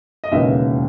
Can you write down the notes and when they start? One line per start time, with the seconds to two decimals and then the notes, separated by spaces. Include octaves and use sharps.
0.24 D#5
0.32 E1 D#2 C#3 E3 E5